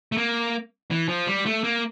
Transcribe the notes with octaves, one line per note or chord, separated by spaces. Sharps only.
A3
A#3
E3
F3
G3
A3
A#3